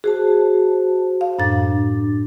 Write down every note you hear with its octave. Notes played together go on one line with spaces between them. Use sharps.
F#4 G#4 C5 A5
F5
F#2 A2 D4 A6